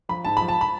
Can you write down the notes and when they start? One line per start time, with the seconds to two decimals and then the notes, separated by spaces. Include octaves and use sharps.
0.09 F3 B5
0.25 G#2 A5
0.37 F3 B5
0.48 A5
0.61 B5